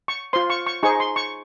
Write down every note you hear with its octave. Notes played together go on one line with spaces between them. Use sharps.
C#6
F4 C5 C6
C#6
C#6
D#4 G#4 C5 C#6
C6
C#6